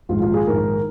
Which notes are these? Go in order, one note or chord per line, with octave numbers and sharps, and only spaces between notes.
A#1 G#2 D#3 G#3 F4
F4
G#4
A#1 G#2 D#3 G#3 A#4